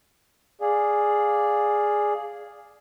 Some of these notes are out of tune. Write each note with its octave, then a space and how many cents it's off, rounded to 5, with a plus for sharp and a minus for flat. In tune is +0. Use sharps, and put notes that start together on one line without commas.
G#4 +0 D5 +0 F5 +0